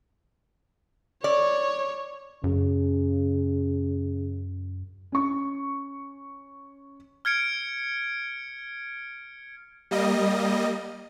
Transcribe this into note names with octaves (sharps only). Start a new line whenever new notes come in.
C#5 D5
F#2 C#3
C#4 C#6
F6 G#6 C#7 D7
G3 A#3 D#5